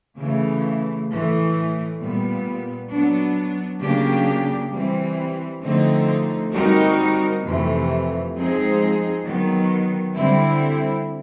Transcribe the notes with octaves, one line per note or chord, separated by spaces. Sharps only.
C#3 E3 A3
A2 E3 A3
A#2 G3 B3
F#3 B3 D4
C#3 F#3 A#3 D4 G4
E3 G3 C4
D3 F3 A3 C4 D#4
G3 C4 D#4 F#4 A#4
F2 C3 E3 A3
F3 G#3 C4 D#4 G#4
D#3 F#3 B3
D3 G3 C4 E4